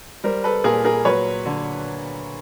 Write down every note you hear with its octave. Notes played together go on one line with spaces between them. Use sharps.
G3 A#4 C5
A4 B4
A#2 G#4 A#4
G#4 A#4
F#3 B4 C#5
D3